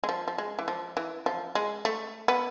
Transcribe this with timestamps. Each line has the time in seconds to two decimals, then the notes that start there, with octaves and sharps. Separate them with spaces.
0.04 G#3
0.09 F3
0.28 F3
0.38 G#3
0.59 E3
0.68 F3
0.97 E3
1.26 F3
1.55 G#3
1.85 A3
2.28 B3